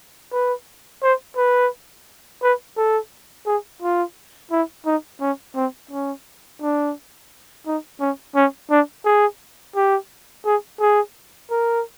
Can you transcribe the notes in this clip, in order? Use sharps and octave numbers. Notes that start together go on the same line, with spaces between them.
B4
C5
B4
B4
A4
G#4
F4
E4
D#4
C#4
C4
C#4
D4
D#4
C#4
C#4
D4
G#4
G4
G#4
G#4
A#4